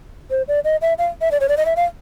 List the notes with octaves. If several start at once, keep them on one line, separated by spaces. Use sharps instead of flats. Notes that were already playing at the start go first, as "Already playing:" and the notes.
C5
D5
D#5
E5
F5
E5
D5
C#5
D5
D#5
E5
F5